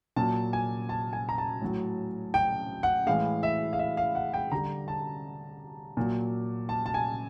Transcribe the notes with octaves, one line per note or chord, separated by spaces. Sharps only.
A#2 F#3 A5
G#5
A5
G#5
A#5
A5
A2 F#3
G5
F#5
A2 E3 G#3 F5
E5
F5
E5
F5
F#5
G5
D3 G3 A#5
A5
A#2 F#3
A5
A5
G#5